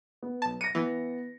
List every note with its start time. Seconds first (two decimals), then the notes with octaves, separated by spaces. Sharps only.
0.23 B3
0.42 B1 A5
0.61 A#6 C#7 D#7
0.75 E3 B3